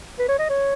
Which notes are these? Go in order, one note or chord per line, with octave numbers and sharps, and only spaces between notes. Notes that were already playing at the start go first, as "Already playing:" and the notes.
B4
C#5
D#5
C#5